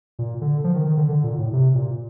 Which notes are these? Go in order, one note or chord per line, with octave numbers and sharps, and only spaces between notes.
A#2
D3
F3
D#3
D#3
D3
D3
A#2
A2
C3
A#2